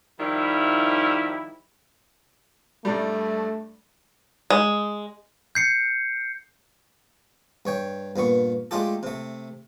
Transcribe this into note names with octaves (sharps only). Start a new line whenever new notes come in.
D#3 F3 G3 E4
G2 G3 A3
G#3
G6 C7 C#7
G2 C#5 G5
G2 A#2 B3 C#6
G#3 A3 D4 F4 G4 A4
C3 A3